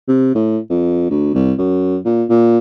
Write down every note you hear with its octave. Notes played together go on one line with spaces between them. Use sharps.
C3
A2
F2
D2
C2
F#2
A#2
A#2